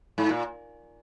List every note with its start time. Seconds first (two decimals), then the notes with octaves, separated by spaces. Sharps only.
0.18 G#2
0.29 A#2